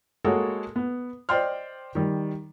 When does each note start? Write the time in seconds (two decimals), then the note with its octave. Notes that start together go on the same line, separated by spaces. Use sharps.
0.24 G#3 A#3 F#4 G#4 A4 C#5
0.76 B3
1.29 C5 D5 D#5 G5 C6 F6
1.95 D#3 G3